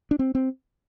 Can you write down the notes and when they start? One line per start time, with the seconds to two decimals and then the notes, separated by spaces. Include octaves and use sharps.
0.11 D4
0.19 C4
0.35 C4